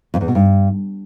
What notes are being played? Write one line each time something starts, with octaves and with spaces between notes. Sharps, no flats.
F2
E2
B2
G2